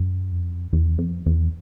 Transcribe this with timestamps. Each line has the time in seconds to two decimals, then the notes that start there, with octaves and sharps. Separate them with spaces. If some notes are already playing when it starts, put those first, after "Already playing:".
Already playing: F#2
0.31 F2
0.73 E2
0.98 F2
1.26 E2